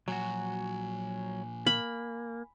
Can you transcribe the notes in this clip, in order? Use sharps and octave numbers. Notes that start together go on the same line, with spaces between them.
A#2 F3 F#3 F#4 G#5
A#3 B5